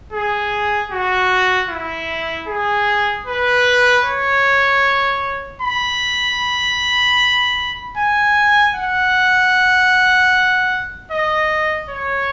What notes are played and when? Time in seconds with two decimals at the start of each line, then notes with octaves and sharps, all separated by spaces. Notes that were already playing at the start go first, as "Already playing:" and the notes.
0.13 G#4
0.91 F#4
1.70 E4
2.48 G#4
3.27 B4
4.05 C#5
5.62 B5
7.97 G#5
8.75 F#5
11.11 D#5
11.90 C#5